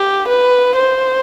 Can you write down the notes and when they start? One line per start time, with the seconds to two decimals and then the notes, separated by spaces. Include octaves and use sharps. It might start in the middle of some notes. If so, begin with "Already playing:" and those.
Already playing: G4
0.28 B4
0.76 C5